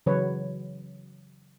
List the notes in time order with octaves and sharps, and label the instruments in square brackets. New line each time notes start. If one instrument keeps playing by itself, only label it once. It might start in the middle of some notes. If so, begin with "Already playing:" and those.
[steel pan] C#3 E3 F#3 B4 C#5